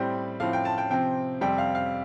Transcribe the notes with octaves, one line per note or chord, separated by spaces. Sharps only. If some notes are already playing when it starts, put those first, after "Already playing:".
Already playing: A2 G3 C4 G4
A2 F3 C4 F5
G5
A5
G5
C3 F3 C4 G5
F2 C3 G3 C4 G5
F5
F5